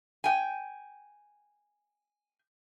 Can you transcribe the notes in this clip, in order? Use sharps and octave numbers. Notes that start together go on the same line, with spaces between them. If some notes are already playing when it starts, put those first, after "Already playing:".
G5 G#5